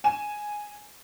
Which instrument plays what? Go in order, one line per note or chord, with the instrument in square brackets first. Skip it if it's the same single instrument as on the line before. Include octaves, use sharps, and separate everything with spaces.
[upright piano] G#5 E7